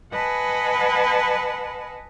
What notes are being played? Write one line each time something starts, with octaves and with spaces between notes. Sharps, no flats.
B4 D#5 F#5 G#5 A5 B5